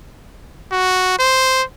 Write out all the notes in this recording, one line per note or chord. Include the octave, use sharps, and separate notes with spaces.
F#4
C5